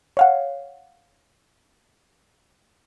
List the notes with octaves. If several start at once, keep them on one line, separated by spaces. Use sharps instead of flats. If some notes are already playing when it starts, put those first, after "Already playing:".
C#5 F5 F#5